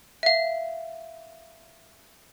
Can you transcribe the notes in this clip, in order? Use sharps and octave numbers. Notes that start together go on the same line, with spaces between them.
E5 F5